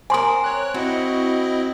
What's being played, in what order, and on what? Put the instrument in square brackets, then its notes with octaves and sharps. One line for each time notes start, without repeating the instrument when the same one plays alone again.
[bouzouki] C4 A#4 [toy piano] G#5 C6 D#6
[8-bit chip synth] C#5 F#6
[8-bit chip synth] C4 E4 D#5 [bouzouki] F#4